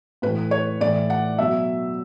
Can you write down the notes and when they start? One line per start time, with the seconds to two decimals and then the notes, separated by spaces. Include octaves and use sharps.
0.22 A2 E3 B4
0.51 C#5
0.81 A2 E3 D5
1.10 F#5
1.38 B2 F#3 E5